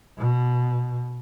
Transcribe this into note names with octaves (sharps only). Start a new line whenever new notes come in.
B2